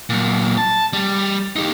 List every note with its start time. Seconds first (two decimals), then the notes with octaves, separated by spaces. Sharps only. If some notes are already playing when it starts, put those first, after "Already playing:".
0.09 A#2 F#3
0.57 A5
0.93 G3
1.56 D#4 G4